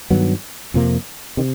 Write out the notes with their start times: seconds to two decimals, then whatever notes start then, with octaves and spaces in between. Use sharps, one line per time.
0.10 G2 D#3 F#3 B3
0.74 F2 C3 F3 A#3
1.37 C3 D#3